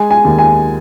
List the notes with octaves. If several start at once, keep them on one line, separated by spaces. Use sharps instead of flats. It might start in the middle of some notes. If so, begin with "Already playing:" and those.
Already playing: G#3 G#5
G#5
D#2
G#5